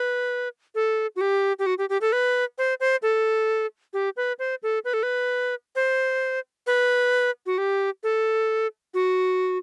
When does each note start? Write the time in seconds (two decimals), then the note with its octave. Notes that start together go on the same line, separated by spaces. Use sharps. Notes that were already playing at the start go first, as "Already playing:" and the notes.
Already playing: B4
0.75 A4
1.16 F#4
1.21 G4
1.59 G4
1.66 F#4
1.78 G4
1.90 G4
2.01 A4
2.12 B4
2.58 C5
2.80 C5
3.02 A4
3.93 G4
4.17 B4
4.39 C5
4.63 A4
4.85 B4
4.94 A4
5.03 B4
5.76 C5
6.67 B4
7.46 F#4
7.58 G4
8.03 A4
8.94 F#4